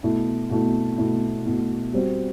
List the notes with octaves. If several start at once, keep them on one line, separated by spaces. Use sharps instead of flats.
B2 A3 E4
B2 A3 E4
B2 A3 E4
B2 A3 E4
G3 C4 F#4